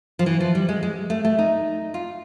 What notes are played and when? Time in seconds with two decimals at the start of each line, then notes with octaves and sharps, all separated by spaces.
0.19 F3
0.26 E3
0.40 F3
0.55 G3
0.69 G#3
0.83 G#3
1.10 A3
1.25 A3
1.39 D#4
1.94 F4